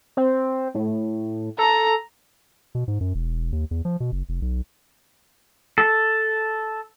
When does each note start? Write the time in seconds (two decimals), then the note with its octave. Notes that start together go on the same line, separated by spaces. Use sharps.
0.17 C4
0.75 A2
1.58 A4 A#5
2.75 B2
2.88 G#2
3.01 F#2
3.15 E1
3.52 D#2
3.71 E2
3.85 F3
4.00 B2
4.12 F#1
4.29 F1
4.42 B1
5.78 A4